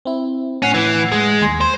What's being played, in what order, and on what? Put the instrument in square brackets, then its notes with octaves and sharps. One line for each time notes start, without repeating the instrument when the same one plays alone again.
[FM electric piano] C4 E4
[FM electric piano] A2 F#5 C7 [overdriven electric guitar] C#4
[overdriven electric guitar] E3
G#3
[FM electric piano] D#2 G#5 C6
[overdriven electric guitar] C5